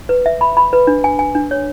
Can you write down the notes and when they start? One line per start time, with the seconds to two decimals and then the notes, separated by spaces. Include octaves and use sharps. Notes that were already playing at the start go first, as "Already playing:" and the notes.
0.09 B4
0.26 E5
0.41 B5
0.57 B5
0.73 B4
0.87 D4
1.04 G#5
1.19 G#5
1.35 D4
1.51 C#5